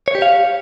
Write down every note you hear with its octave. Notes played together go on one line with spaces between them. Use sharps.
C#5
G4
F5